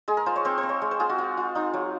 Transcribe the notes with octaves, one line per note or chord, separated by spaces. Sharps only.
G#3 G#4
A#4
F4 C5
C#5
C4 C5
C5
C4
C#5
G#3
C5
F4 G#4
F#4
F4
F4
D#4 F4
F#3